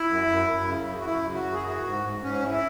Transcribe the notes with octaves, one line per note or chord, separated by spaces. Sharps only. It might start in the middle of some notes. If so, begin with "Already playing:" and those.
Already playing: E4
F#2
F#2
F#2
C#3
F#2
F#4
F#2 E4
C#3
F#4
F#2
G#4
E3 F#4
G#2
G#2
G#2 C#4
E3
E4